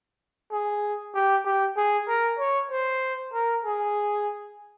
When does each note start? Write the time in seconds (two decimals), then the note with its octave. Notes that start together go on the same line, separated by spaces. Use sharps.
0.51 G#4
1.14 G4
1.45 G4
1.76 G#4
2.08 A#4
2.39 C#5
2.71 C5
3.33 A#4
3.65 G#4